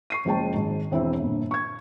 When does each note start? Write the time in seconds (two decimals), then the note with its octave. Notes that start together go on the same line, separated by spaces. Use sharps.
0.10 C#6 C7 D#7
0.25 F#1 F3 G#3 C5 G5 A5
0.53 G#1 G#2
0.91 E1 C4 E4 E5
1.20 G1 A#2
1.51 C#6 G#6